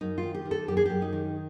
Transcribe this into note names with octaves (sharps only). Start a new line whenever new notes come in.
F#2 D#4
F4
D#3
G4
D#3
A4
F#2 G4
G#4
F#2 G4
D#4
D#3